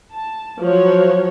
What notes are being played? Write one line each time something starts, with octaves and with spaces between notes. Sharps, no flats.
A5
F3 F#3 C#5